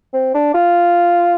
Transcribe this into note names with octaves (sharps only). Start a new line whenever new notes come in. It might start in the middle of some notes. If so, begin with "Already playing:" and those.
C4
D4
F4